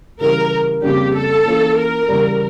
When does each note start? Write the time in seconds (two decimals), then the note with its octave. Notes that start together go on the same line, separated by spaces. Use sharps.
0.20 C#3 E3 G3 C#4 G4 A#4
0.82 F2 C#3 G3 A#3 D4 G4
1.14 A4
1.46 E3 A#3 C#4 F4
1.77 A#4
2.08 E2 C#3 G3